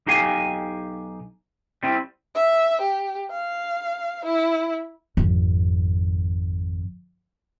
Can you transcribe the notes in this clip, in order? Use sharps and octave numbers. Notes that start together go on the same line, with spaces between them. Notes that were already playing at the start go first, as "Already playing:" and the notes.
B1 D#4 G4 F5 G#5
G3 C4 E4
E5
G4
F5
E4
G#1 F2